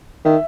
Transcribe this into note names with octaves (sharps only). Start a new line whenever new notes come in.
D#3 E5